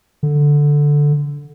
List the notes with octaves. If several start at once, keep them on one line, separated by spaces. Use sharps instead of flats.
D3